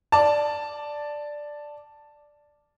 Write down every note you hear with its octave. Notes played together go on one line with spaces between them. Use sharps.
D5 A5